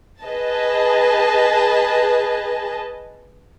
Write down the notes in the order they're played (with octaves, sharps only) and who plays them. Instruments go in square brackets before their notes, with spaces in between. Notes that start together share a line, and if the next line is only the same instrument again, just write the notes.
[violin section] G#4 B4 D#5 A5